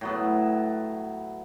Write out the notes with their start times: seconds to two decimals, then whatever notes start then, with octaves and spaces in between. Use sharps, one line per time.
0.01 A2 F#3 B3